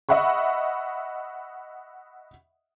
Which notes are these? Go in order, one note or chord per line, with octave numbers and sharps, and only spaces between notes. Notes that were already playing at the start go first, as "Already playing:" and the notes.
D#5 E5 F#5 B5 C#6